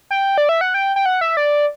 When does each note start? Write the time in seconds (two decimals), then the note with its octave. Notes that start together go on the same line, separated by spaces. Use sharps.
0.11 G5
0.38 D5
0.49 E5
0.61 F#5
0.74 G5
0.96 G5
1.06 F#5
1.21 E5
1.37 D5